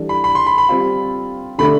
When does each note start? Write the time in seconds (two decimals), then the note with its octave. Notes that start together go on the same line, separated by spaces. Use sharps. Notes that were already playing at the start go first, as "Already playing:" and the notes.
Already playing: E3 G3 D4 A4
0.09 B5
0.24 B5
0.35 C6
0.47 B5
0.58 B5
0.69 G3 C4 F4
1.58 D3 A3 D4 B5